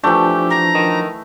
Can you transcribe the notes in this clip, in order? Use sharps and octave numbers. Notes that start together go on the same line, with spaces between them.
E3 F3 A3 D4 G4
A#5
D#3